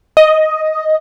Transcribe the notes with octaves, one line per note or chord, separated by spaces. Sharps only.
D#5